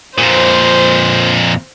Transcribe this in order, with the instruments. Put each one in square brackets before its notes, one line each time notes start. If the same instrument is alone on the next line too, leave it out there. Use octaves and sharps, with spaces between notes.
[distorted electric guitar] F2 A#2 [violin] C5